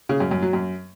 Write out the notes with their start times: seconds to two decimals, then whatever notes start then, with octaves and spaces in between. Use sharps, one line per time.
0.09 C#3
0.20 F#2
0.31 F#2
0.42 F#3
0.53 F#2